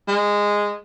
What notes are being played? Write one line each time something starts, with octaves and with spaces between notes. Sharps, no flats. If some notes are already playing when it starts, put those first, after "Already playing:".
G#3